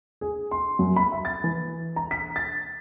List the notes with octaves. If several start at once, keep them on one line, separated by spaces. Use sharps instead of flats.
G#4
C6
F#2
B5
E5
A6
E3
A#5
B6
A6